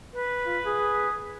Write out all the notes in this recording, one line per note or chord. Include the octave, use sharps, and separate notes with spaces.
B4
F4
G#4